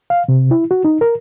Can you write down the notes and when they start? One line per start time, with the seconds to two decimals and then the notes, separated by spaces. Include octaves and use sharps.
0.10 F5
0.29 C3
0.51 E4
0.71 F#4
0.85 D#4
1.01 A#4